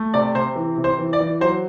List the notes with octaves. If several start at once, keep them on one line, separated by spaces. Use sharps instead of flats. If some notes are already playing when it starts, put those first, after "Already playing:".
Already playing: A3
C3 D5
C3 C5
E3
C3
C5
E3
D5
E3
F#3 C5